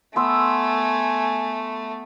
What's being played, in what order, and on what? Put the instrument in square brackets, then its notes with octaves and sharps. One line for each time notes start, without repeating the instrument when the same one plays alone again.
[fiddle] A3 [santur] B3 C6 E6 [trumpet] G#5